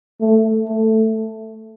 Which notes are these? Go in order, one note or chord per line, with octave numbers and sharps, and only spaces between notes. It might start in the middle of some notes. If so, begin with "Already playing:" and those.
A3
A3